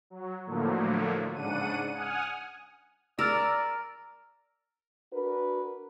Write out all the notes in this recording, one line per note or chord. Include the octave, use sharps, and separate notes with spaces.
F#3
A2 D3 F3 F#3 A3 A#3
G#2 C#3 D4 F#5 D#7
F#5 G#5 D#6 F6
A#4 D5 E6 F6 A6
D4 F#4 A#4 B4